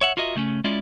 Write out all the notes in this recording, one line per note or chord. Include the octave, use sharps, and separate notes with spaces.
C#5 E5 F#5
F4 F#4 A#4 D#5 E5
C#3 A3 C4 C#4
G#3 C#4 E4 F4 D5